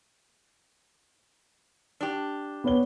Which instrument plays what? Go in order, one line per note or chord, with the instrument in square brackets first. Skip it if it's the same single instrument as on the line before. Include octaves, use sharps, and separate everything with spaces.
[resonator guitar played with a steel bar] D4 G4
[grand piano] B3 C#5 G7